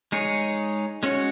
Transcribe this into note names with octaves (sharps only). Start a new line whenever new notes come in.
G#3 D#4 G#4 C#5
G#3 C#4 F#4 C#5